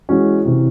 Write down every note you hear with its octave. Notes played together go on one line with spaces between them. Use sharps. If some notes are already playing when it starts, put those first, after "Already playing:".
E3 G#3 C#4 F#4
C3 E3